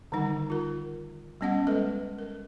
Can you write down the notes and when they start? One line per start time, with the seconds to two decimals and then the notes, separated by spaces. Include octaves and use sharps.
0.12 D3 D#3 G3 D#4 F#5
0.50 F4 A#4
1.41 G3 B3 C#4 D#5 F#5
1.67 G#3 A4 B4 D#5
2.19 A#4